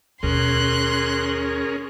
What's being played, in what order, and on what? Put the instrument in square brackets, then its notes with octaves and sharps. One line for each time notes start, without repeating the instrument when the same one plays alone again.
[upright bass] D#2 B2 [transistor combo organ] C#4 G#4 A#4 [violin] C6 F#6